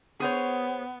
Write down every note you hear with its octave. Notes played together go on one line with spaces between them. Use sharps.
B3 G#4 C5 C#5